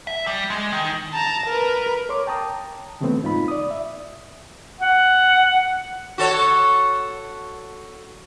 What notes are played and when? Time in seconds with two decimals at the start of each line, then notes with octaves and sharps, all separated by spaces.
0.07 E5
0.27 G3
0.50 G#3
0.72 D#3
1.13 A5 A#5
1.46 A#4 B4
2.09 A#4 C#5 C6 D6
2.27 G5 A5 A#5 D#6
3.00 D2 C#3 E3 A3 B3 C4
3.22 G#2 D#4 F4 B5
3.48 D5 D#6
3.71 E5
4.80 F#5
6.18 F#4 A4 C#5